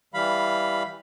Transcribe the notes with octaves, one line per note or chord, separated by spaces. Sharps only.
E3 G3 F5 B5